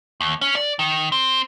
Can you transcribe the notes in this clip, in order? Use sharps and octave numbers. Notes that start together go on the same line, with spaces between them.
D#2
C#4
D5
D#3
C4